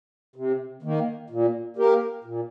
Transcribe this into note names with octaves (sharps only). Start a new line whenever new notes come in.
C3
D#3 A#3
A#2
A#3 G4 A#4
A#2